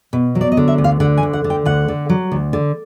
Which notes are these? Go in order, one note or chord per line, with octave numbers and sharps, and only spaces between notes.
B2
F#3
D5
D#5
D3
E5
D2
F5
D3 F#5
G#5
D2
F#5
D3
G5
D2 F#5
D3
F#3
D2
D3